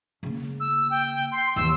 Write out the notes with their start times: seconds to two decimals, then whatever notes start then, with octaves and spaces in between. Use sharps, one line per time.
0.23 C#3 A#3
0.60 E6
0.90 G5
1.32 C6
1.56 D#2 E3 E6